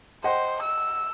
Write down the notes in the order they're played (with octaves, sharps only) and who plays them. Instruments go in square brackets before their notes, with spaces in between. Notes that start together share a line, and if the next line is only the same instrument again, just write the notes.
[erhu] C5 [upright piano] D#5 F#5 G5
[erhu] E6